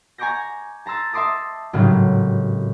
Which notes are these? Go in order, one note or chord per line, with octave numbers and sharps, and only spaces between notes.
G#5 A#5 C#6 D6 G6 A#6
A5 A#5 C6 E6 A6
E5 A5 C6 D6 D#6 A#6
G#1 A2 C#3 F#3 G3